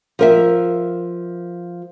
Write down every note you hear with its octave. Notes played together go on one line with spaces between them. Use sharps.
F3 A#4 E5